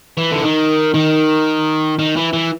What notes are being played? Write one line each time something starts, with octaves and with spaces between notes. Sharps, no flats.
E3
D3
D#3
D#3
D#3
E3
E3